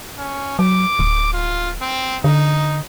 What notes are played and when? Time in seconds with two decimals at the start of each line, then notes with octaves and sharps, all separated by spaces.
0.18 C#4
0.59 F#3 D6
0.99 D1
1.33 F4
1.81 C4
2.24 D3 D#4